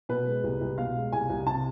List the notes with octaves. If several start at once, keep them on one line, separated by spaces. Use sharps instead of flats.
B2 B4
G#3
C2
C2
B2 F5
G#3
C2 G#5
C2
C3 A5